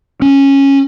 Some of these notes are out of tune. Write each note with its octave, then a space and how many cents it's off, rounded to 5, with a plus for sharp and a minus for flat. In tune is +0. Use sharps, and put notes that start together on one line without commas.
C#4 -10